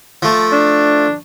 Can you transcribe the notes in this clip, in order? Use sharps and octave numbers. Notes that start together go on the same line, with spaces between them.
F3 A3
D4